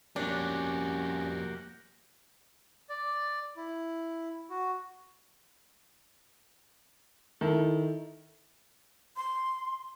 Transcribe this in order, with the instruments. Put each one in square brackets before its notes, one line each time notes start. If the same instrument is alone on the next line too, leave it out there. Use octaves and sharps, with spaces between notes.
[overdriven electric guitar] F2 G3 [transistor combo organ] A#3 F#4 G4 [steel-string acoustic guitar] C#4 [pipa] D4
[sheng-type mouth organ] D5
E4
F#4
[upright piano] D#3 [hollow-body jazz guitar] E4 A4
[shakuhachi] C6